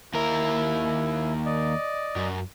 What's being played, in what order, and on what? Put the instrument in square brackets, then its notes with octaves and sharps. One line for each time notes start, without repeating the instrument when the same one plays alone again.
[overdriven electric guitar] D#2 A#4 [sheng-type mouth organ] E4
[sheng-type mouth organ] D5 D#5
[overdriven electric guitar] F#2